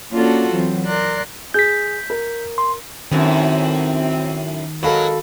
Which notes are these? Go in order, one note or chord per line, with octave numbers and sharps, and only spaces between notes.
A#3 C#4 D4 F4 F#4 A4
E3 F#3 C4
A#4 D5 C6 F#6
G#4 G6 B6
A#4
C6
F#2 A2 D#3 C4
F#3 G#3 A4 A#4 F5 B5